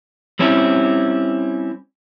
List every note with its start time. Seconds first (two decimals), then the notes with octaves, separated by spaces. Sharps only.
0.39 G3 C4 C#4 E4